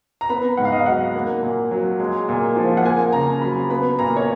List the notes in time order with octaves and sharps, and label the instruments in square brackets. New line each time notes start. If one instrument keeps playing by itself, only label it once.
[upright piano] A#5
B3 B5
G#2 F#5
F5
D#5
F5
F#3 F#5
A#3
A#2
F#3
G#3
A#2
F3
F#5
A#3 G#5
C#3 A#5
F#3 B5
B3 B5
A#2 A#5
C#5